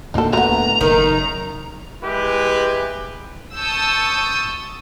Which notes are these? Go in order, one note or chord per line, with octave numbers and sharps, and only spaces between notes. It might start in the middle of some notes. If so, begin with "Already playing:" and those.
D2 A2 A#3 D#4 A4
A3 B3 A#5
F#1 D#3
G#3 E4 G4 B4
A5 C#6 D#6 E6 G6